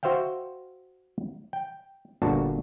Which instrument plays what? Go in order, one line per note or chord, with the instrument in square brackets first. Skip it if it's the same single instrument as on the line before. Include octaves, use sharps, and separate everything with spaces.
[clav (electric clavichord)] F#4 C5 E5 F5 G5
G5
G1 A#2 D4 F#4 A5